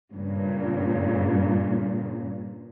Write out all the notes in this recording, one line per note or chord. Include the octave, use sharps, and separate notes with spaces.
G2 A#2 C#3